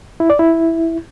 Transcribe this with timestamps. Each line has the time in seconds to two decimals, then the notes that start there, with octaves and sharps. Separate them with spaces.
0.20 E4
0.30 D5
0.39 E4